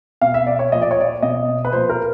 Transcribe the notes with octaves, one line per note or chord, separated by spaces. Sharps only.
B2 F5
E5
D5
C#5
A#2 F3 D#5
D5
C#5
D5
B2 D#5
B4
A#2 F3 C5
A#4